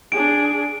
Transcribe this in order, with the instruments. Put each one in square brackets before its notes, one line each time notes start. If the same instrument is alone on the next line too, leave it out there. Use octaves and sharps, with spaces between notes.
[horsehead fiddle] D4 G#4 [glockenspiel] D7